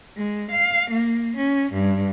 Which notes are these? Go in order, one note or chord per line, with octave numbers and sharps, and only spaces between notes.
G#3
F5
A#3
C#4
G2